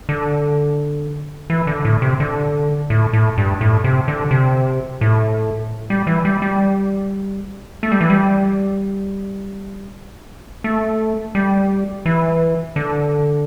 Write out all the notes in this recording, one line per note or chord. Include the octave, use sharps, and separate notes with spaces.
D3
E3
D3
A2
C3
D3
A2
A2
G2
A2
C3
D3
C3
A2
G3
E3
G3
G3
A3
G3
E3
G3
A3
G3
E3
D3